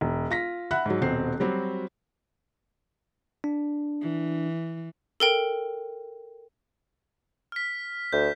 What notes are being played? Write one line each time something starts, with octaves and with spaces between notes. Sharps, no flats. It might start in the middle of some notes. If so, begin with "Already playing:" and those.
E1
F4 A#6 B6
E5 F#5 B5 F#6
G#2 F#3
D#1 B2 C4 C7
F#3 G3 C4 F#4
D4
E3
A4 A#4 G5
F6 B6
D2 G6